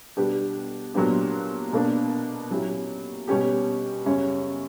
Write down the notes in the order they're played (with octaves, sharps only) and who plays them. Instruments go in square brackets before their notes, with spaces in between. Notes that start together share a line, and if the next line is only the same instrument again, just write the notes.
[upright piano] B2 G3 B3 D4 G4
A#2 F#3 B3 D4 G4
B2 A#3 D4
A#2 F#3 C#4 E4 G4
B2 G3 C#4 G4
F#2 C#3 G3 C#4